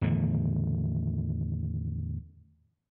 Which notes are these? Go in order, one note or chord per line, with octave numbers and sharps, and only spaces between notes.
E2 A2 D3 D#3